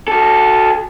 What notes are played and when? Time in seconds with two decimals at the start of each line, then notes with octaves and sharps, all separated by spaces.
0.08 F#4 A4